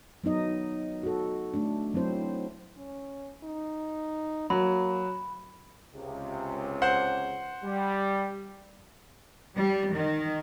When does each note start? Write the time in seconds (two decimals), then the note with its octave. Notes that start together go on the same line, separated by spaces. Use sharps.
0.24 F#3 B3 D#4 D#5
1.03 F#4 A4
1.54 A3 D4
1.94 F#3 C4 E4 C5
2.77 C#4
3.44 D#4
4.50 F#3 A#3 B5
5.95 C#2 C3
6.82 C5 F#5
7.64 G3
9.55 G3
9.94 D#3